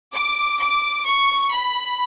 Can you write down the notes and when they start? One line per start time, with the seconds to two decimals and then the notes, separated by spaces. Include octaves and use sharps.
0.14 D6
0.60 D6
1.06 C#6
1.52 B5